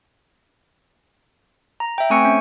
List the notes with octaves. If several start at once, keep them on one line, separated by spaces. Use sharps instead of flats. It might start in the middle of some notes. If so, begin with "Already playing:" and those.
A#5
E5 G5
A3 C4 G#5 C#6 E6 C#7
C#4